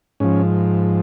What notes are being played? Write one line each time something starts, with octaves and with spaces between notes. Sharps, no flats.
G#2 F3 C#4